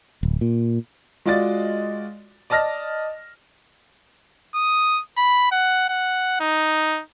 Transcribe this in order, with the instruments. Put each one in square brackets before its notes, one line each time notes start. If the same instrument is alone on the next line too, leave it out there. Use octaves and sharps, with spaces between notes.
[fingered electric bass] D1
A#2
[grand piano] G#3 F4 F#4 D5 D#5 A6
D5 D#5 A5 F6 A#6
[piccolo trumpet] D#6
B5
F#5
F#5
D#4